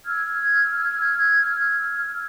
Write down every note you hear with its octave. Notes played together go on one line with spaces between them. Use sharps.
E6 F6 G#6